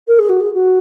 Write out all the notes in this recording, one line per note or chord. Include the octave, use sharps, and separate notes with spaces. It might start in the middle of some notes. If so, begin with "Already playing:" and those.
A#4
G#4
F#4
G#4
F#4